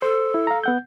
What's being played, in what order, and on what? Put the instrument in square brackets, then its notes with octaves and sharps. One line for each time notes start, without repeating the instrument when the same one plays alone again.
[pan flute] A4 [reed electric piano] C5
[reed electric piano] E4
F5 A#5
B3 F#5 G6